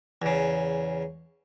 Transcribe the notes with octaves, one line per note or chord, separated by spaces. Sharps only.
E2 C#3